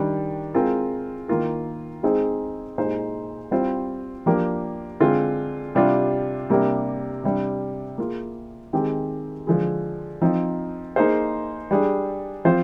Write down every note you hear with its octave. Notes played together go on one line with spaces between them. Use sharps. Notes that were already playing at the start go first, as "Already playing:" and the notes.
Already playing: D#3 G3 D4
G#3 C4 F4 A#4
D#3 A#3 F4 A#4
G#3 C4 D#4 G#4 C5
A#2 G#3 D#4 G4 C5
G3 C4 F4 C5
F3 A#3 D4 G4
D3 G#3 C4 F4
C3 G3 D4 F4
C3 G3 A#3 D4 G4
C3 G3 D4
A#3 F4 G#4
D#3 G#3 C4 G4
D3 F3 G#3
F3 C4 D#4
A#3 D#4 G#4 C5
G3 D4 G#4
F3 C4 F4 C5